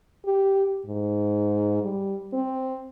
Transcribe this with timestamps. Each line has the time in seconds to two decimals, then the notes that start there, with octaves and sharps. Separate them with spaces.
0.25 G4
0.87 G#2
1.83 G3
2.34 C4